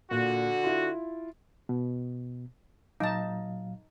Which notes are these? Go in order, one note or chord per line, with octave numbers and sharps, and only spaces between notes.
A#2 D3 F#4
E4 F4
B2
A#2 F#3 D#4 F5 A5